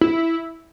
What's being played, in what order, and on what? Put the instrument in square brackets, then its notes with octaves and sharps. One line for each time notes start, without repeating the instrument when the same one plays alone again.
[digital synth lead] E4